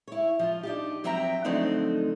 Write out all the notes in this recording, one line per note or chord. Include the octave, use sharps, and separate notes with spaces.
E4 C#5
F3 F4
D4 D#4 G4
F3 F#3 C4 E5 G5 A#5
D3 F3 F#3 A3 C4 D#4